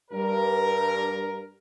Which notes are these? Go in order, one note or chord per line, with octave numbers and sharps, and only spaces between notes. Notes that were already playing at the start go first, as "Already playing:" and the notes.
G2 A#4